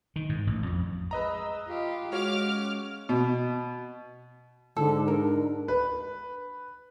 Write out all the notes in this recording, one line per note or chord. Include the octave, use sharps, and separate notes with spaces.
D#3
G#2
A1
F2
G#3 B4 D#5 A#5 E6
F4 G4 F5
G#3 F#4 C#5 D6 F6
C#4
B2
G#2 D3 A4
D4 A#4
B4